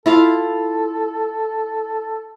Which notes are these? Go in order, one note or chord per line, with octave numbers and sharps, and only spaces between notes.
E4 F4 A4 F5